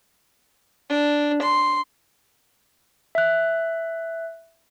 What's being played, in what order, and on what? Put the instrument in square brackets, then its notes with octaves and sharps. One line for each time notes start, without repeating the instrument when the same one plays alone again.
[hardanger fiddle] D4
C6
[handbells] E5 F#6